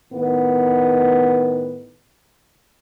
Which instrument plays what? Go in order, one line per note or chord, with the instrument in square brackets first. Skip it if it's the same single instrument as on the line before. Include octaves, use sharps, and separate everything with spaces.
[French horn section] A2 D#3 B3